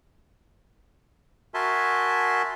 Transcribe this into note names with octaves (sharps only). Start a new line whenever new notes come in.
F#4 A#4 E5 G#5 A5 C6